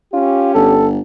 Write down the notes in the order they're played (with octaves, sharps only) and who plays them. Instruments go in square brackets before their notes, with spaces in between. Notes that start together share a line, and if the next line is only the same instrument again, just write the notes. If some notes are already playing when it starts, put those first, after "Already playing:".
[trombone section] C#4 G4 [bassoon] F4
[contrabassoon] G1 [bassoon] A4